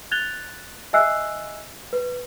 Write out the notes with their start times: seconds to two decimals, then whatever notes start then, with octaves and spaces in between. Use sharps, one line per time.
0.11 F#6 G#6 A6 F7 G7
0.93 D#5 E5 G#5 E6 F#6 C7
1.93 B4